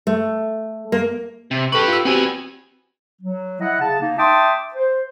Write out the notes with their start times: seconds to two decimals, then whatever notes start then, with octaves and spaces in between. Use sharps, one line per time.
0.07 A3
0.92 A#3
1.51 C3
1.72 G4 A4 B4 C#6
1.88 F4 E6
2.05 B3 C4 F#4 G4 G#5
3.22 F#3
3.61 E4 D#5 E5 F#5
3.80 C#3 A5
4.01 A#3 D#4
4.19 E5 G5 A5 C6 D6 D#6
4.75 C5